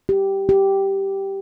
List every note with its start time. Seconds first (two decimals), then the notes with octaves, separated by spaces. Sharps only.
0.09 G4
0.49 G4